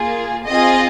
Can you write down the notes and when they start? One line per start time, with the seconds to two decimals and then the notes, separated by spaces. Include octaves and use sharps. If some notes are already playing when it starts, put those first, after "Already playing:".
Already playing: A#3 F4 G#4
0.47 C4 F4 G#4 D#5